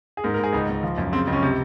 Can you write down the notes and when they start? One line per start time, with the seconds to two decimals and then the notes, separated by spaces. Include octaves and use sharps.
0.17 G#4
0.24 G#2 A#4
0.34 A#4
0.39 G#2 G#4
0.53 C#2 D#4
0.69 C#2
0.83 F3
0.98 F#2
1.12 C#3 C4
1.27 C#2
1.33 C#4
1.42 C3